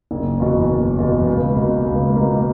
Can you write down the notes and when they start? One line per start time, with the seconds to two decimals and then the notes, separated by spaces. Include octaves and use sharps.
0.11 F#1
0.40 E2 B2
0.69 F#1
0.99 E2 B2
1.27 C#2
1.56 B2 A#3
1.85 C#2
2.16 B2 A#3